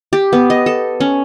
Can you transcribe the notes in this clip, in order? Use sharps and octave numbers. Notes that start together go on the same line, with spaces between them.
G4
B3
D#5
A4
C#4